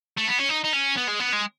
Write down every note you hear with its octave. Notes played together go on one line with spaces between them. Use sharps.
A3
B3
C#4
D#4
D#4
C#4
B3
G#3
B3
G#3